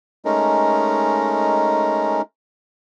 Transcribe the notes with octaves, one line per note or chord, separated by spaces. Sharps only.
G#3 A3 C#4 D#4 A#4